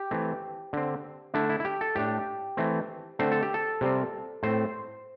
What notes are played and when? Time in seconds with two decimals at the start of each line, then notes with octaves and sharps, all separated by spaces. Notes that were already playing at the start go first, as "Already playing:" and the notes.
Already playing: G4
0.11 E3 A3 C4
0.73 D3 C4
1.34 D3 A3 D4 E4
1.49 E4
1.60 E4
1.65 G4
1.81 A4
1.95 A2 A3 D4 G4
2.57 E3 A3 C4
3.19 D3 A3 C4 C5
3.32 A4
3.43 G4
3.54 A4
3.81 C3 G3 C4
4.43 A2 A3 C4 C5